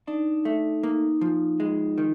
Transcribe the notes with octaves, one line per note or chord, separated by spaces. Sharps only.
D4 D#4
A3
A#3 D#4
F3
G#3
D#3